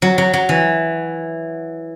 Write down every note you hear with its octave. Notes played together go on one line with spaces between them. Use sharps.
F#3
F#3
F#3
E3